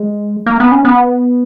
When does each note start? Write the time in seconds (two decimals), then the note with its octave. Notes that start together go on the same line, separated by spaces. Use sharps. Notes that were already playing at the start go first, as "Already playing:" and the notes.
Already playing: G#3
0.46 A#3
0.60 B3
0.72 C#4
0.85 B3